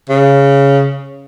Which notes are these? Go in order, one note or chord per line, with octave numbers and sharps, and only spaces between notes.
C#3